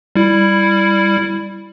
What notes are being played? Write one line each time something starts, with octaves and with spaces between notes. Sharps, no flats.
G3 E4